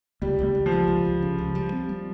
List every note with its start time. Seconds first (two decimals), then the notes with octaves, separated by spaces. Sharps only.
0.22 C#2 G3
0.39 C#2 G3
0.55 C#2
0.66 F3
0.72 C#2
0.88 C#2
1.05 C#2
1.22 C#3
1.39 C#2
1.55 G3
1.73 C4
1.89 G3